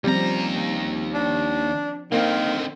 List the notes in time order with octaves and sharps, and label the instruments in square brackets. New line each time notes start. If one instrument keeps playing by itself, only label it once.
[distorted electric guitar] D#2 A#5 [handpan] F3 C4 C#4 [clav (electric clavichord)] G3
[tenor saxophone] D4
[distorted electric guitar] D3 C4 [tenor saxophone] D#3 [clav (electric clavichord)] A#3